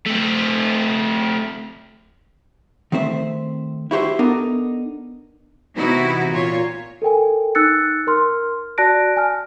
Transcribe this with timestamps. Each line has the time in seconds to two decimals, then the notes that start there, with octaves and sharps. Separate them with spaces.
0.07 A3 C4
2.92 D#3 A3 C4 C5 E5
3.91 E4 F#4 G4 C5 E5
4.19 B3 D4 D#4 A4 A#4
5.77 C3 E3 B3 D#4 E4 F#4
6.30 A#2 F4 C#5
7.02 A4 A#4 G5 G#5
7.55 D#4 E6 F#6 A6 C#7
8.07 A#4 C6 F6
8.78 F#4 D5 A5 F#6 A#6 D7
9.16 G#5 A5 F6